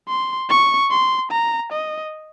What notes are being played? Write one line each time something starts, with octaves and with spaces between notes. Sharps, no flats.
C6
C#6
C6
A#5
D#5